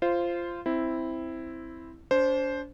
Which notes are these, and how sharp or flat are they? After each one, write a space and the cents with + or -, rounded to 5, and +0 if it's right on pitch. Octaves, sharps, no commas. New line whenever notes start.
F4 -15 C5 +0
C4 +0 E4 +0
D4 -40 C5 +0